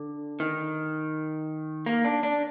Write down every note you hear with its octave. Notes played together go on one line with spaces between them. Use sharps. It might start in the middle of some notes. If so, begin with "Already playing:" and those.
Already playing: D3
D#3
A#3
D4
D4